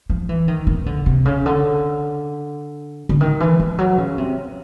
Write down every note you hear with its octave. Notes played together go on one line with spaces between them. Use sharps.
F3
E3
D#3
D#3
D3
C3
C#3
D3
D3
D#3
E3
F3
F#3
C#3
C3